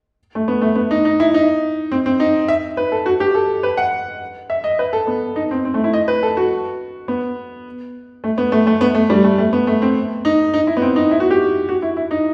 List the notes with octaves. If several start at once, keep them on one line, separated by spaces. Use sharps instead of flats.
A3
B3
A3
B3
D#4
D#4
E4
D#4
C4
C4
D#4
E5
B4
A4
F#4
G4
A4
B4
F#5
E5
D#5
B4
A4
B3
D#4
C4
C4
A3
E4
D#5
B4
A4
F#4
B3
A3
B3
A3
A3
B3
A3
G3
A3
A3
B3
A3
C4
D#4
D#4
E4
B3
C4
D#4
E4
F#4
G4
F#4
E4
E4
D#4